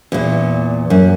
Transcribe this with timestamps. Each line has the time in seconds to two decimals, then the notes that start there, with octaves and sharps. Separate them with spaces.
0.12 E2 A#2
0.90 F#2